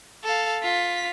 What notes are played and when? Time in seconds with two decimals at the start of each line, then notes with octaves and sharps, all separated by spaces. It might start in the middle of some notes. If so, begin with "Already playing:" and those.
0.24 A4 F5
0.63 F4 B6